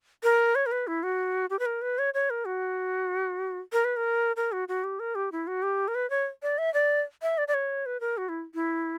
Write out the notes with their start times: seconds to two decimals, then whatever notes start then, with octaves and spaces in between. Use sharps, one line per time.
0.23 A#4
0.55 C#5
0.66 A#4
0.72 B4
0.87 E4
1.03 F#4
1.50 G4
1.59 B4
1.66 A#4
1.82 B4
1.99 C#5
2.14 C#5
2.30 A#4
2.45 F#4
3.73 A#4
3.85 B4
3.97 A#4
4.37 A#4
4.52 F#4
4.68 F#4
4.84 G4
5.00 A#4
5.15 G4
5.32 E4
5.47 F#4
5.63 G4
5.88 A#4
5.95 B4
6.10 C#5
6.43 D5
6.58 E5
6.74 D5
7.22 E5
7.38 D5
7.48 D5
7.54 C#5
7.86 B4
8.01 A#4
8.17 F#4
8.29 E4
8.54 E4